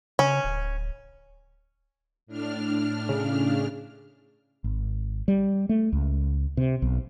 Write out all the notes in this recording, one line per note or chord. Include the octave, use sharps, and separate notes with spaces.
C#3 C#4
D1
A2 D4 F6
C#3
G#1
G3
A3
C#2
C3
B1